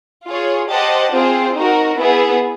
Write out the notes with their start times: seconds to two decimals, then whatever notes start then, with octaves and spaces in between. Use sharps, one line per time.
0.26 F4 G#4 C#5
0.69 G4 C5 D#5 F#5 A5
1.11 C4 F4 G#4 C5
1.55 D#4 F#4 A#4
1.98 B3 E4 G#4